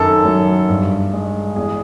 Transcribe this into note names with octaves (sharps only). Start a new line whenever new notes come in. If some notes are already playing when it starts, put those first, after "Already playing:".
Already playing: F#2 D#3 A4
F#3
G2
G#3
E2 G#4